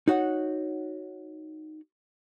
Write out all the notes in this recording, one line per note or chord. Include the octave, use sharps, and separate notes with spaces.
D#4 F#4 C#5 F#5